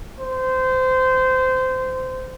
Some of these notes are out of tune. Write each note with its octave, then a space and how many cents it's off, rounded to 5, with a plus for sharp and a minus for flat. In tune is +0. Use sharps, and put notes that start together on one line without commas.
C5 -20